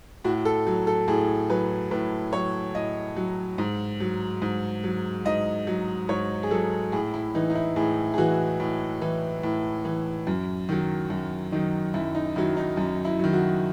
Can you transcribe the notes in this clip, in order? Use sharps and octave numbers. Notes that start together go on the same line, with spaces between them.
A2 F#4
A4
F#3
A4
A2 G#4
F#3 B4
A2 B4
F#3 C#5
A2 D#5
F#3
G#2
F#3
G#2
F#3
G#2 D#5
F#3
G#2 C#5
G#4
F#3 A4
A2 G#4
E4
E3 D#4
D#4
E4
A2 G#4
G#4
E3 F#4
A2
E3
A2
E3
F#2
D#3 F#3
F#2
D#3 F#3 D#4
F#2 E4
D#4
D#3 F#3 E4
D#4
F#2
E4
D#3 F#3
F#4